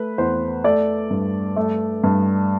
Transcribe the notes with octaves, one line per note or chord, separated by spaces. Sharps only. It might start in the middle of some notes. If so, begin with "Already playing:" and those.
Already playing: A3 B4
E2 C5
A3 D5
G2
A3
G2